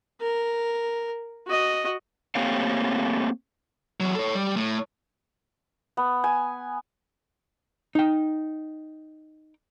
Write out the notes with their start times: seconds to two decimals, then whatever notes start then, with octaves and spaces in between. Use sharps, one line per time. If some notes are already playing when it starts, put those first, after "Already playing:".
0.21 A#4
1.47 F#4 D#5
2.35 A3 A#3 C4 G4 C#5 F5
4.00 E2 F#3
4.15 A4 C#5
4.35 G3
4.57 A2
5.97 B3
6.24 G#5
7.95 D#4 G5